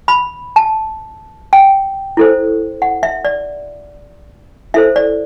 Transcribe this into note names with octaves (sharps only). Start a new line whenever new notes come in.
B5
A5
G5
E4 A4 C5
F#5
E5
D5
E4 A4 C5 E5
D5